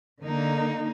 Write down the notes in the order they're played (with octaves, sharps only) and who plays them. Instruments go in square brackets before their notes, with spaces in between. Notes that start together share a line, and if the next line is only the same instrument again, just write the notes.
[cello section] D3 A#3 D#4